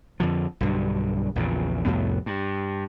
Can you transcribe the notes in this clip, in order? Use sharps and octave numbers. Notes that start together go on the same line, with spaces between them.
F2 D3 F3
B1 G2 D3
A#1 E2 A#2 C#3
C2 F2 A2 B3
G2